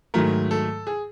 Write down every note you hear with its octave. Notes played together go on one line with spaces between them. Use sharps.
G#2 D#3 F#3 A3 A#4
A4
G#4